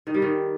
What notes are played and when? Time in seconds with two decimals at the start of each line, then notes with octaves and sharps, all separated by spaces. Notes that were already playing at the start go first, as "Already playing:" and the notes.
0.07 D#3
0.14 G3
0.22 D#3